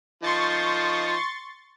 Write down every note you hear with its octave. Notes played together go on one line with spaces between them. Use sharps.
F3 D#4 C6 C#6 A6